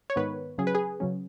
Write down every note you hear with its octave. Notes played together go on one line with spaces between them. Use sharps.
C#5
G#2 D#3 B3 B4
C#3 F#3 C#4 G#4
B4
G#4
C#3 F#3 C#4